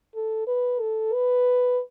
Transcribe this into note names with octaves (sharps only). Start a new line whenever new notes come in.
A4
B4
A4
B4